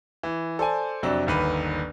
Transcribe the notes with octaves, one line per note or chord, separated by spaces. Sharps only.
E3
A4 C5 D5 G#5
F2 C3 F#3 D4
G1 D#2 B4 B5